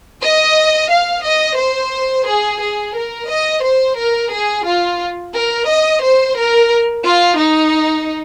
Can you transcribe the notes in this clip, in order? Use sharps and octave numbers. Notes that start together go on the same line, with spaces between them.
D#5
F5
D#5
C5
G#4
G#4
A#4
D#5
C5
A#4
G#4
F4
A#4
D#5
C5
A#4
F4
D#4